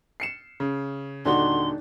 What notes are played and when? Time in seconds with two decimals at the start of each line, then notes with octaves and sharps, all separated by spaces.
0.20 C7 C#7 E7
0.60 C#3
1.25 D#1 D3 D4 D#4 F#4 C6